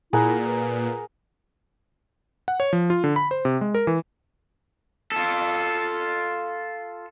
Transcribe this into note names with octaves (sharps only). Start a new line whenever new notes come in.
A#2 E4 G#4 A#4 F#5
B4
F#5
C#5
F3
F4
D3
B5
C5
C3
G#3
A#4
E3
F4 A4